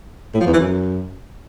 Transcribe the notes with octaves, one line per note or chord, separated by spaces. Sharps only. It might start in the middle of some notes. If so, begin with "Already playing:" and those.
A2
F3
E2
E3
F#2